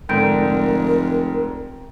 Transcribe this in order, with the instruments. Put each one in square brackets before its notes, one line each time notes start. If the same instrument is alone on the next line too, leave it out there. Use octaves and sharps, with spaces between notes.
[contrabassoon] F1 [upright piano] G#2 D3 [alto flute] A#4 [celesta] G5 G6 D7